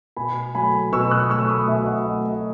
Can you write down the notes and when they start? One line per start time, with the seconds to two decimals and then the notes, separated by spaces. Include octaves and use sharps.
0.17 B2 G#5 B5
0.55 F#3 A3 G#5 B5
0.92 B2 C#6 E6
1.11 D#6 F#6
1.30 F#3 A3 C#6 E6
1.49 B5 D#6
1.68 B2 E5 G#5
1.87 D#5 F#5
2.05 F#3
2.10 A3
2.25 D#5